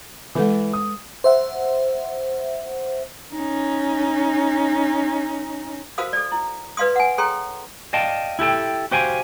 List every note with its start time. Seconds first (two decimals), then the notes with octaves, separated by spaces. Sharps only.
0.35 E3 G#3 A4 B4
0.73 D#6
1.24 C5 E5 F#5
3.33 C#4 D#4
5.98 F#4 A#4 C5 F5 D#6
6.13 A4 D5
6.32 E4
6.77 B4 D5 F5 C6 D#6
6.96 F#5 G#5
7.18 G#4 A4 C#5 G5 A#5 C6
7.93 D5 D#5 F5 G5 A5
8.39 E4 G4 A4 G5
8.91 F#4 G4 C5 F5 G5 G#5